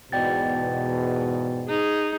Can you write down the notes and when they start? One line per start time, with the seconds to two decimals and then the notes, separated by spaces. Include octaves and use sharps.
0.12 E2 G#2 B2 D5 G5 A6
1.68 D#4 G#4